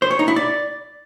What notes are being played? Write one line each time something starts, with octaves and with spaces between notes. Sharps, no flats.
C5
C#5
D#4
E4
D5